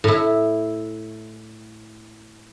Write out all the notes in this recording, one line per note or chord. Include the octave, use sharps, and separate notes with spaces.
A2 E4